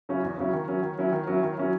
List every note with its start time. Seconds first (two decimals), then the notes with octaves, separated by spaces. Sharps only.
0.09 C#3 F#3 C#4 E4
0.23 E2
0.38 C#3 F#3 C#4 E4
0.53 D#3
0.68 F#3 C#4 E4
0.83 D#3
0.98 F#3 C#4 E4
1.12 D#3
1.27 F#3 C#4 E4
1.43 D#3
1.57 F#3 C#4 E4